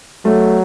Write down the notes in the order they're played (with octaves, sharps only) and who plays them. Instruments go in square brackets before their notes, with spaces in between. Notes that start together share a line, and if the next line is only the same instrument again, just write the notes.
[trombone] F#3 [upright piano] A3